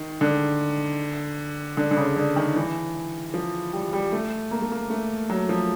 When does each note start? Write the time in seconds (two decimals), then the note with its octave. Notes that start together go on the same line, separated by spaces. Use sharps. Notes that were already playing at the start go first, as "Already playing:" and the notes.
Already playing: D#3
0.21 D3
1.77 D3
1.91 D3
1.97 C#3
2.16 D3
2.36 D#3
2.56 E3
3.34 F3
3.73 G3
3.93 G3
4.12 A3
4.51 A#3
4.61 A3
4.72 A#3
4.90 A3
5.30 F#3
5.49 F3